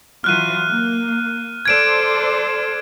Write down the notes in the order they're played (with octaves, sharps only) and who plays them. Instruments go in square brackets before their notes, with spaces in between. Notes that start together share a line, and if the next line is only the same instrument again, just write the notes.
[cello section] E3 F#3 F4 [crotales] F6 F#6 D#7
[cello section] A#3
[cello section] A4 C5 D5 [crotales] G#6 D7 E7